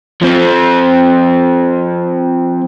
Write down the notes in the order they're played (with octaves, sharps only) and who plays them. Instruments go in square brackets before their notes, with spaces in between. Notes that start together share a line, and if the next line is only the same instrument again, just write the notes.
[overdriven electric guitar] F3 C4